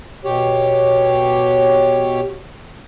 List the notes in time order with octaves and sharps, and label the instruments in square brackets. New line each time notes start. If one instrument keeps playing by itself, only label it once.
[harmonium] B2 G4 C#5